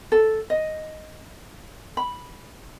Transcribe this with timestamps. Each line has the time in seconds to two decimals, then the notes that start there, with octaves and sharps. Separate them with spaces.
0.12 A4
0.50 D#5
1.97 B5